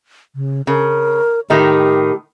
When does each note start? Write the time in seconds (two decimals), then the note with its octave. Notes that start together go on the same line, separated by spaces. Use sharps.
0.36 C#3
0.67 C#3 A#4
1.50 A2 D#3 D#4 G4